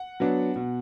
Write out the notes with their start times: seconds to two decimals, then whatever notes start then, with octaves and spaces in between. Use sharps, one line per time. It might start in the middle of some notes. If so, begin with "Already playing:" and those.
Already playing: F#5
0.20 F#3 B3 D4
0.56 B2